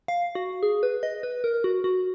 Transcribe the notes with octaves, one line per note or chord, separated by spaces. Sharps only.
F5
F#4
G#4
B4
D#5
B4
A#4
F#4
F#4